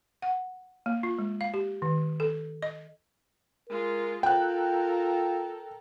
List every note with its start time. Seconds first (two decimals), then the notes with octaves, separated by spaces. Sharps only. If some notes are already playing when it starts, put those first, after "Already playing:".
0.22 F#5
0.86 A#3
1.03 F4
1.19 G#3
1.41 F5
1.54 G4
1.82 D#3
2.20 A4
2.62 D#5
3.69 G#3 F4 A#4
4.23 F4 A4 A#4 G5 F#6